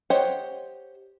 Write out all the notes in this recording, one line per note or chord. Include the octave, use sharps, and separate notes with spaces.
G4 C5 C#5 D#5 F#5